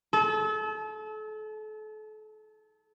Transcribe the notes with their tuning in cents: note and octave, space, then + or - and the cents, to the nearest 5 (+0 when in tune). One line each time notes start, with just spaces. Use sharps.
A4 -35